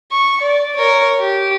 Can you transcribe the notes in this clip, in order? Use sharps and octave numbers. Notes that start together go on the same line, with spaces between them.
C#6
D5
A#4 C#5
G4